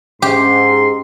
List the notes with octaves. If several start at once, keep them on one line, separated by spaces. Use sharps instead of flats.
G#2 C#4 G4 C6